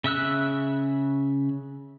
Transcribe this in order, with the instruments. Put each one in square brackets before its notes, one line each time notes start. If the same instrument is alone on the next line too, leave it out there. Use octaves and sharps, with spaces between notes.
[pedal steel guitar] C#3 E5 E6 F#6